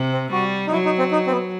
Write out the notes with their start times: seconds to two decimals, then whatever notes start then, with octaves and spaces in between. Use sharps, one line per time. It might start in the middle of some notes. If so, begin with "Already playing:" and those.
Already playing: C3
0.13 C4
0.32 G3 F#4
0.67 D#4
0.72 F#3 E4
0.85 D#4
0.98 C4
1.11 D#4
1.27 C4
1.31 B3